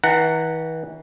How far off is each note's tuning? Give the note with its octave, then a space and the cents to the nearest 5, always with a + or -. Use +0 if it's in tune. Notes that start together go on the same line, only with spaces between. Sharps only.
E3 -40 F#5 +0 A#5 -25